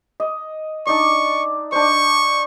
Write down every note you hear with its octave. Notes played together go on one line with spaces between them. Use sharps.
D#5
D4 D#4 D5 C#6
D4 C5 C#6